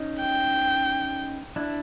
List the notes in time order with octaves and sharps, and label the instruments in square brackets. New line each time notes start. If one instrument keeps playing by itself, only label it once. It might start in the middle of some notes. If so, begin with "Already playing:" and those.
Already playing: [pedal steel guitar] C#4 D#4
[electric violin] G5
[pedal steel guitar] D4 E4